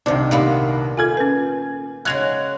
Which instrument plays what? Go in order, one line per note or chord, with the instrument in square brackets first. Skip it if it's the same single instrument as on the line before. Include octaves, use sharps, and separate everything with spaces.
[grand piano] C2 D4 [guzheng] C3 D#3 [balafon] C5
[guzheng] A#2 A#3 B3 [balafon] G4 F5 B5
[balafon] F4 A4 [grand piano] G#5 G#6
[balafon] C#4 B4
[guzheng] C#3 G#3 F#4 [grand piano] F#6 G#6 F7